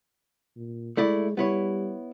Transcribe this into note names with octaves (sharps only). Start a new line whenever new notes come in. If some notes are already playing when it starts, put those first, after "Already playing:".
A#2
G#3 A3 E4 D5
G3 B3 E4 C#5